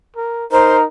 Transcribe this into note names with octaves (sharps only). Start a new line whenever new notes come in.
A#4
D#4 A#4 C5